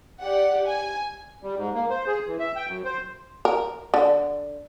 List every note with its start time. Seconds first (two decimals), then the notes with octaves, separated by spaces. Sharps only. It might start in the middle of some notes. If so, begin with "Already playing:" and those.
0.20 G4 D5 F#5
0.66 G#5
1.43 G3
1.57 G#2
1.74 A#3
1.90 C5
2.07 G#4
2.27 E3
2.40 E5
2.56 G5
2.68 F#2
2.84 C5
3.45 A#4
3.94 D3